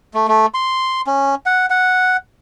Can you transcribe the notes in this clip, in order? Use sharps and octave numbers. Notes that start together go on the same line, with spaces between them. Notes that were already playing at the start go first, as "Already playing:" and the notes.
A3
A3
C6
C#4
F#5
F#5